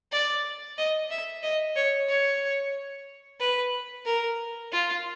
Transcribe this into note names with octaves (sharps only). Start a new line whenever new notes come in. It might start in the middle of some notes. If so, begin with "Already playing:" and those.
D5
D#5
E5
D#5
C#5
C#5
B4
A#4
F4